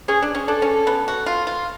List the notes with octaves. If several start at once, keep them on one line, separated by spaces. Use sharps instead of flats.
C#4 G#4
D4
C#4
D4 A4
C#4
B3
F#4
F4
F4